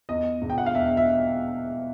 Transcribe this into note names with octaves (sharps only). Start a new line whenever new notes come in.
E2 D#5
E1
G5
F#5
F5
E2 E5
E5